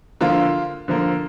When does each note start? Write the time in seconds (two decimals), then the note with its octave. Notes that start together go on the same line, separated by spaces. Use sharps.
0.21 D3 F3 A#3 F4
0.88 D3 F3 A#3